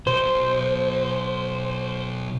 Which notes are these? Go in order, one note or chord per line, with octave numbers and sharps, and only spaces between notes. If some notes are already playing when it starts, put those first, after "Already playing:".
B1 C5